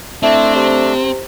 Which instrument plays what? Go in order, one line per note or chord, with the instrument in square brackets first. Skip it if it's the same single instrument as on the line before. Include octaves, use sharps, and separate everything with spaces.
[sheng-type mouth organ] A3 D4 [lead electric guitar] C4 [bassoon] E4
[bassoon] C3